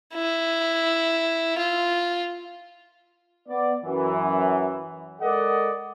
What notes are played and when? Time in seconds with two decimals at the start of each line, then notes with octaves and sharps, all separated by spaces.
0.14 E4
1.58 F4
3.48 B3 D5
3.85 F#2 E3
5.21 G#3 A4 A#4 D5 D#5 F#5